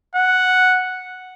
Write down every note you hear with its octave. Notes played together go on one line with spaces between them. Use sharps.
F#5